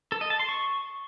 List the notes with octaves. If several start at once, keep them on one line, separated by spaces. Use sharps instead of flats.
A4
D#5
A5
C6
C#6